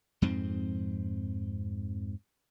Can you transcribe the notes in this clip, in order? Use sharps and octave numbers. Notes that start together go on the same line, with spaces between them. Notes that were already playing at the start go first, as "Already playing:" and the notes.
F2 G#2 C4